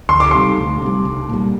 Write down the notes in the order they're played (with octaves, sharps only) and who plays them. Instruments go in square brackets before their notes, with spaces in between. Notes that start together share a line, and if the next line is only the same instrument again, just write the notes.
[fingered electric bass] D2 [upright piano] C6
[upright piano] D6
[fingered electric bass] C3 G3 [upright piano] C6
[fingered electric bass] D2
C3 G3
C2
A#2 G3